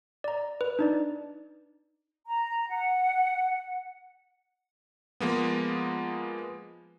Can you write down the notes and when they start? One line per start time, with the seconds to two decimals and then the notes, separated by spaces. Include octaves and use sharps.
0.24 D5 A#5
0.61 B4
0.79 D4 D#4 D5
2.27 A#5
2.69 F#5
5.20 F3 G#3 A#3 B3